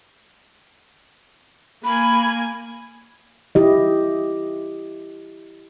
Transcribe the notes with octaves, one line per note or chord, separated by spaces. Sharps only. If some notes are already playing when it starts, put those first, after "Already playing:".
A#3 G#5 B5
E4 G4 D#5